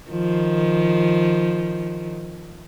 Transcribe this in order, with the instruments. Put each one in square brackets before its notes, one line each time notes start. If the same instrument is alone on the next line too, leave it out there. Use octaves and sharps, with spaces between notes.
[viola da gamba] D#3 F3